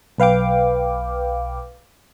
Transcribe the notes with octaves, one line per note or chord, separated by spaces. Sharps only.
B1 B4 F5 G5 D6